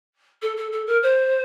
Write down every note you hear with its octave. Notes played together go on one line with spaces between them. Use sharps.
A4
A4
A4
A#4
C5